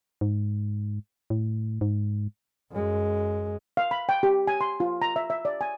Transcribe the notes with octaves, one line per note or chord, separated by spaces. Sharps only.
G#2
A2
G#2
F#2 G#3
F5
B5
G5
G4
G#5
C6
F4
A#5
E5
E5
D5
G#5